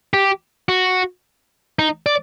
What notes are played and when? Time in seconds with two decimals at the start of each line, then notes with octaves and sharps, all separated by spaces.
0.14 G4
0.69 F#4
1.79 D#4
2.06 D5